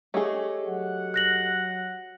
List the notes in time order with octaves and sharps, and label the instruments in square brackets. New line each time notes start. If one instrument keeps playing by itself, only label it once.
[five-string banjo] A3 G#4 [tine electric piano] G4 C#5 D#5
[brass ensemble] F#3 F#5
[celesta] F#6 A#6 F#7